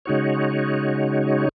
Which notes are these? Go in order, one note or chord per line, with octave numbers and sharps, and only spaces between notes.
C#3 G#3 D#4 F#4 C#5